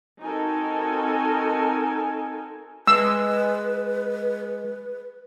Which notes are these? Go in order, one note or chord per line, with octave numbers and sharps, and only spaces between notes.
C4 D#4 F#4 A4 A#4 G#5
G#3 B4 E6